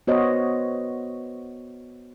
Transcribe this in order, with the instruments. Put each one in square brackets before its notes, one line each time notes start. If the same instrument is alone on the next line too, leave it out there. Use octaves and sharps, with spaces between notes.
[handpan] B3 F#4 C5 C#5 D#5